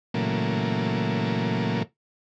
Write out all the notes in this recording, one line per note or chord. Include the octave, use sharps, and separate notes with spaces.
A#2 C#3 E3 F#3 A3 A#3